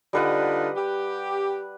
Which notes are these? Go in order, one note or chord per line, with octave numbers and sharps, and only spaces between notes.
D3 G3 D#4 F4 B4 F#5
G4